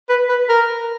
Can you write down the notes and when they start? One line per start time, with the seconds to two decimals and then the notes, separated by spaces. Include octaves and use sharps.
0.09 B4
0.29 B4
0.49 A#4